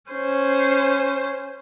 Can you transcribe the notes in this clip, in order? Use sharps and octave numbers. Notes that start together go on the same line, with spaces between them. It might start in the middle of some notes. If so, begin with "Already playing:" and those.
C#4 C5